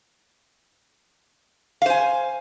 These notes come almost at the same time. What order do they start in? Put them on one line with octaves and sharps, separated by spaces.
F5 C5 G#5